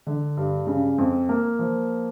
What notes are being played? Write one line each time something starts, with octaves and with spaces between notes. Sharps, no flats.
D3
G2
C#3
F2
A#3
F3